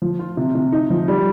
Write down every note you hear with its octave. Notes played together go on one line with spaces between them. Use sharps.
F3
F4
C3
C3
D#4
F3
G3